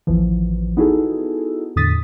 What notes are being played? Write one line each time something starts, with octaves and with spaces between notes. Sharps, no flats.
A1 D#2 E3 F3
B3 D#4 E4 F#4 G#4 A4
E2 A2 D3 D#6 A6 B6